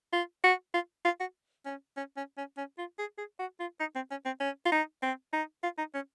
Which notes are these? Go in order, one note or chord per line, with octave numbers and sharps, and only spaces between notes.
F4
F#4
F4
F4
F#4
C#4
C#4
C#4
C#4
C#4
F4
G#4
G#4
F#4
F4
D#4
C4
C#4
C4
C#4
F4
D#4
C4
D#4
F4
D#4
C#4